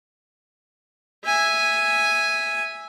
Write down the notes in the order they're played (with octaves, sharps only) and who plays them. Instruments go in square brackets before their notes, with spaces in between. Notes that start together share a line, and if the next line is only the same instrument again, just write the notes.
[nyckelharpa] E5 G#5